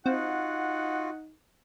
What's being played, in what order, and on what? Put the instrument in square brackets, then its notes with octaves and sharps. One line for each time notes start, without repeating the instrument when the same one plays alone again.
[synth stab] C4 [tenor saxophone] D#4 [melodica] F4 F#4 [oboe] F#5